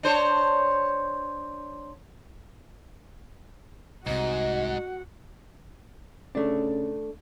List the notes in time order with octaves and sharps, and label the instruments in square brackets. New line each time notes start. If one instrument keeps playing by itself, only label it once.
[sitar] D4 C5 C#5
[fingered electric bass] C2 C3 [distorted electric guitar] G#2 [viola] F#4 F#5 [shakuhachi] D#5
[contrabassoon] C#3 [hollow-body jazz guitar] A3 D4